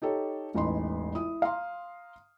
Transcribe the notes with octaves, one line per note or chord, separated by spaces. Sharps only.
D#4 G4 A4 C#5
E1 A1 D#4 B5 C6
E4 D#6
F5 A#5 C6